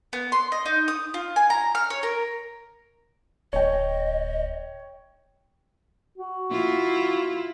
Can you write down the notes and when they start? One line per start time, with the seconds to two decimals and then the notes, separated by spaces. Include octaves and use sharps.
0.13 B3
0.32 C6
0.52 D#5
0.66 D#4
0.88 D#6
1.14 F4
1.36 G#5
1.50 A#5
1.75 F6
1.90 C#5
2.03 A#4
3.53 D1 C#5 D#5 G5
6.18 F#4
6.51 E4 F4